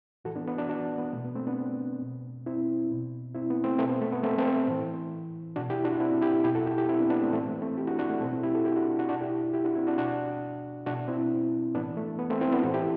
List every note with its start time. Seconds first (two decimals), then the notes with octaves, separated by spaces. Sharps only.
0.25 A2 E3 F#4 A4
0.36 B3 D4
0.48 B3 D4
0.58 D4 F#4
0.69 D4 F#4
0.98 B3
1.13 B2 A3
1.25 B3
1.35 A3 C4
1.47 B3 D4
2.02 B2
2.46 C4 E4
2.91 B2
3.34 C4 E4
3.50 B3
3.64 A3 C4
3.78 B2 A3 C4
3.89 B3
4.02 A3
4.13 B3
4.23 A3 C4
4.38 A3 C4
4.68 A2 E3
5.56 B2 D4 F#4
5.70 E4 G4
5.85 D4 F#4
6.00 C4 E4
6.22 E4 G4
6.44 B2 E4 G4
6.55 F#4 A4
6.66 E4 G4
6.78 E4 G4
6.89 C4 E4
6.99 B3 D4
7.10 B3 D4
7.22 A3 C4
7.33 A2 E3 A3 C4
7.48 A3
7.62 A3 C4
7.77 E4 G4
7.87 D4 F#4
7.99 D4 F#4
8.10 A3
8.21 B2 A3 C4
8.32 C4 E4
8.43 E4 G4
8.55 F#4 A4
8.65 E4 G4
8.76 D4 F#4
8.99 D4 F#4
9.09 B2 D4 F#4
9.21 E4 G4
9.54 E4 G4
9.64 D4 F#4
9.75 C4 E4
9.87 D4 F#4
9.98 B2 D4 F#4
10.86 B2 D4 F#4
11.08 C4 E4
11.75 A2 E3 B3 D4
11.97 A3
12.19 B3
12.30 A3 C4
12.41 C4 E4
12.53 B3 D4
12.63 A2 E3 F#4 A4
12.74 E4 G4